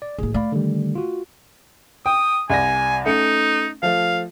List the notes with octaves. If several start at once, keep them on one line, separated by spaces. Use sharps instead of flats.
D5
A1 A#3 G#4
A3 D5 F5 B5
D3 D#3 G3
F4 F#4
G5 D#6
C2 D5 G#5 A#6
A3 C#4 D#4 C#7
F3 A3 F5